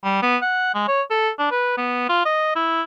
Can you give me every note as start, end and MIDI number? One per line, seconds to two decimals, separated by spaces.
0.04 0.20 55
0.22 0.37 59
0.42 0.71 78
0.75 0.83 56
0.88 1.02 73
1.10 1.30 69
1.39 1.49 62
1.51 1.77 71
1.78 2.08 59
2.09 2.23 65
2.25 2.53 75
2.56 2.82 64